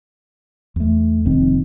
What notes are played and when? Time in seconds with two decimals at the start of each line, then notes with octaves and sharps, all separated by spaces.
0.76 E2 A3
1.25 F1 A#1 D#3 C4